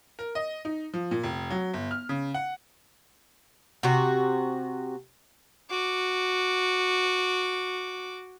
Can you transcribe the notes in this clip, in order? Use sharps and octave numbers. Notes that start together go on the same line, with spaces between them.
A#4
D#5
D#4
F3
A#2
F1
F#3
G1
F6
C#3
F#5
C3 F#4
F#4 D6